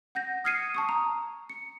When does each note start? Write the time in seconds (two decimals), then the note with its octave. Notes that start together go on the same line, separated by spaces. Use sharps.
0.15 F#5 G6 A#6
0.44 D#6 F6 G#6 C7 C#7 D#7
0.75 A5 C#6 D#6
0.89 A#5
1.50 C#7